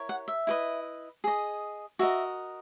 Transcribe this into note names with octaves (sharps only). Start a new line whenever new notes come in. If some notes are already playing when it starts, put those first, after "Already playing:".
Already playing: E4 A#4 C#5
F#5
E5
E4 B4 D#5
G#4 D#5
F#4 A#4 D#5 E5